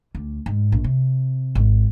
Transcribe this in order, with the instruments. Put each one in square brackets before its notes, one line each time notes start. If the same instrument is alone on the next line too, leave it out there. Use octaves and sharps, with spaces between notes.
[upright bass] D2
G#2
A#1
C3
G#1